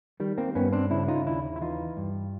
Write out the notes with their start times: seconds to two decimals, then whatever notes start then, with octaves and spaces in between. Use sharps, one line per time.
0.20 D#3 G3
0.38 A#3 C4
0.55 G2 B3 C#4
0.73 C4 D4
0.91 C#3 D4 E4
1.08 D#4 F4
1.26 D#2 D4 E4
1.56 E4
1.61 E3 D#4 F4
1.97 G2